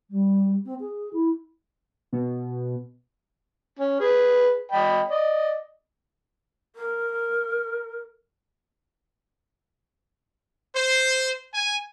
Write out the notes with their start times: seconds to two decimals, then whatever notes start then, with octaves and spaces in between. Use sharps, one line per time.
0.10 G3
0.65 C4
0.80 G#4
1.13 E4
2.12 B2
3.79 C#4
4.00 G#4 B4
4.72 D#5 G5 B5
5.08 D5 D#5
6.76 A#4
10.76 C5
11.54 G#5